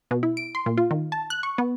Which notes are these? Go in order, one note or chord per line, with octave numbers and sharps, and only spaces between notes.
B2
E4
D7
C6
A#2
F4
D#3
A5
F#6
C#6
B3